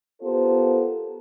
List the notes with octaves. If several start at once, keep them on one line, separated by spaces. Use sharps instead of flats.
B3 F4 G4 A4 A#4 C5